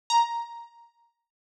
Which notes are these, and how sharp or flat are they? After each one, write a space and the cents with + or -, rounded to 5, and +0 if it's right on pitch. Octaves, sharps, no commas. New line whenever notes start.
A#5 +5